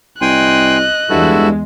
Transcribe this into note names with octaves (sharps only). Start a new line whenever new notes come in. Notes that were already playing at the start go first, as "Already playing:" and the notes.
C2 D#5 G5 G#5 C6 F#6
E2 G2 G#3 E4 F#4 A4